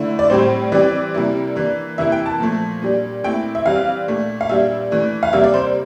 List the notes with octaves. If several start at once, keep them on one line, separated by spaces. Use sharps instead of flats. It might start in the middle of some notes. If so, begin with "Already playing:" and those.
Already playing: D3 A3 E4
D5
A2 G3 C4 C5
E3 G3 C4 D5
C3 G3 A#3 E4
E3 A#3 D4
C3 E3 A#3 E4 E5
G5
A5
A#2 F3 A3
A#2 G3 D4
A#2 A3 C4 E4 G5
E5
E3 G3 C4 F5
A#2 A3 D4
F5
A#2 G3 D4 E5
E3 A3 D4
F5
C3 G3 A#3 E5
D5
C5